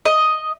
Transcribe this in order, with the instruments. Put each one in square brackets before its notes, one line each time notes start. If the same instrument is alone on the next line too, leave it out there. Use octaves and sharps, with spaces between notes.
[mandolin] D#5